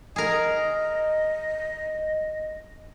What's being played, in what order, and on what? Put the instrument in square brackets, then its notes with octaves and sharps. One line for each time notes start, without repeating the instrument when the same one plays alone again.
[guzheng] G#4 A#4 [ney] D#5